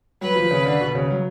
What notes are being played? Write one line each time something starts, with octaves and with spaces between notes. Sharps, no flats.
F#3 B4
F3
C#3
D3
B2
C#3
F#3